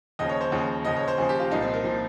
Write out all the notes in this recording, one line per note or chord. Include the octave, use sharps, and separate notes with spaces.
D#2 C#3 F3 D#5
C#5
C5
D#2 C#3 F3
D#2 C#3 F3 D#5
C#5
C5
D#2 C#3 F3 G#4
G4
F4
C2 A#2 F3 D#4
C4
A#4
A#2 F3